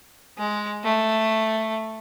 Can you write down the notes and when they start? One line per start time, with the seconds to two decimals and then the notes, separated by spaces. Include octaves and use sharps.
0.38 G#3
0.84 A3